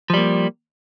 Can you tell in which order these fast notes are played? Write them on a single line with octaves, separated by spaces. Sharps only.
F3 G3 A#3